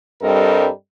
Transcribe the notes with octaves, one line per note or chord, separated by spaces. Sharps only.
G2 G3 C4 A4 A#4 D#5